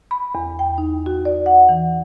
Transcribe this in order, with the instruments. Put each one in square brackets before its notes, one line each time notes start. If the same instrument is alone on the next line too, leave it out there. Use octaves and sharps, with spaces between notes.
[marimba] B5
E2
G5
D#4
F#4
D5
F#5
E3